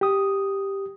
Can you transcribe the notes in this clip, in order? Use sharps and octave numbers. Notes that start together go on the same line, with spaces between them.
G4 D#6